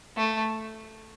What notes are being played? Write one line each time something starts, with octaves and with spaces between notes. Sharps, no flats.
A3